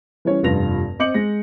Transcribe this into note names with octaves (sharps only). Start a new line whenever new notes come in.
E3 G3 C#4 C#5
F1 G2 F4 A#6 F7
C4 D#5 D6 G6 C#7 F#7
G#3 A#6